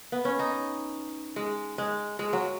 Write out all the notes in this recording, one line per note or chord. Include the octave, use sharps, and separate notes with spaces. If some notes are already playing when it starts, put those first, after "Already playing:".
B3
C#4
D#4
G#3
G#3
G#3
F#3